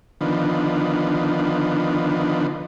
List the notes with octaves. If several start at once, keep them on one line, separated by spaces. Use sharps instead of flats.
D3 D#3 F3 B3